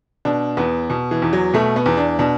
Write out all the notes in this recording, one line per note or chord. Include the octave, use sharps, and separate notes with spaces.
B2 D4
E2 B3
B2
E3
E2
F#3
B2 A3
B3
E2
D4
B2 D4